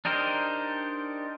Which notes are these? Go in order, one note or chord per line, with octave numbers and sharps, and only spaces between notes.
D4 D#4 G4 A#4 C5